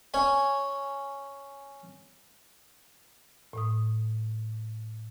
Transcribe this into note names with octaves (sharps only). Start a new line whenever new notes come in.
C#4 C#5 G#5
A2 D#6